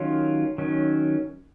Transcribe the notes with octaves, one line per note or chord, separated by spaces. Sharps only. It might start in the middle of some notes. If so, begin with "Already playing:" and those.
Already playing: D#3 F#3 C#4 F4
D#3 F#3 C#4